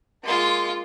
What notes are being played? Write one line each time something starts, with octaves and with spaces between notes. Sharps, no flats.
G#3 A#3 F4 C6